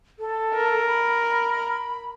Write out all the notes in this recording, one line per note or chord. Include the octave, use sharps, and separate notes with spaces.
A4
A#4
B5